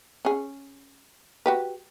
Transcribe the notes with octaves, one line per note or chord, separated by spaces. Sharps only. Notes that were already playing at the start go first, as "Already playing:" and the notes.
C#4 G#4
F#4 G4 B4